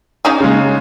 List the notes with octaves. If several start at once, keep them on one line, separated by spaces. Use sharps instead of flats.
C#4 D#4 G#4
C#3 G#3